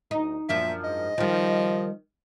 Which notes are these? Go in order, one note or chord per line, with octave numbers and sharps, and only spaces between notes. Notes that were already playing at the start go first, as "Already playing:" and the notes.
D2 D#4
F#2 A#2 F3 D4 E5
G#2 D#5
D#3 F3 G3